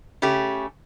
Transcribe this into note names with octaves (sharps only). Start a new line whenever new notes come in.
C#3 A3 C#4 G4